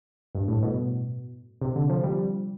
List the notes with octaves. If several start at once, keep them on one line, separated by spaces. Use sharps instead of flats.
G2
A2
B2
C3
D3
F3
G3